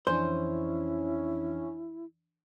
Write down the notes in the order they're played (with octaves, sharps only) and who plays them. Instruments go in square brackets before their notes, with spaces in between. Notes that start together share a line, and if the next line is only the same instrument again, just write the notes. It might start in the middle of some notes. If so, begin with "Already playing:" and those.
[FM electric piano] F2 E3 D4 [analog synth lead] C#4 [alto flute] E4 [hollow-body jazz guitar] C5